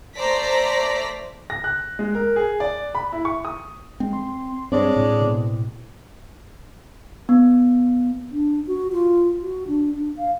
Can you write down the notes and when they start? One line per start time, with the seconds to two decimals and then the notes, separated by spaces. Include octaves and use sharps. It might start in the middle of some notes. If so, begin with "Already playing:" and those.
0.17 A3 C5 D5 A#5 A#6 B6
1.50 A#6
1.64 F#6
1.99 G#3
2.15 A#4
2.36 G#4
2.60 D5
2.95 B5
3.12 E4
3.25 C#6
3.45 D#6
4.00 G#3 C4
4.13 C6
4.72 G2 G#3 C4 D4 C#5 D5
4.96 A2
5.20 B2
7.29 B3
8.32 D4
8.67 F#4
8.93 F4
9.41 F#4
9.67 D4
9.95 D4
10.17 F5